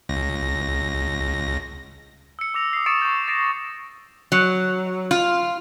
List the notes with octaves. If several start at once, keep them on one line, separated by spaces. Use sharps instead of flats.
C#2 A#6
E6 C#7
D6 E6 A#6 F7
D#6 C7
C#6 D#6 A6 C#7 D7 E7
C#6 G6
A6 A#6 C7 D7 E7
F#3
F4